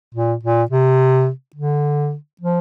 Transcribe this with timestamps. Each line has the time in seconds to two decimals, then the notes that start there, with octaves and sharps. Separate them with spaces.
0.14 A#2
0.43 A#2
0.71 C3
1.56 D3
2.41 F3